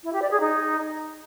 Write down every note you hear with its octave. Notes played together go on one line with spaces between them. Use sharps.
E4
G4
D5
G#4
D#4